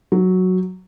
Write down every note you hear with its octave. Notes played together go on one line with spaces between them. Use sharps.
F#3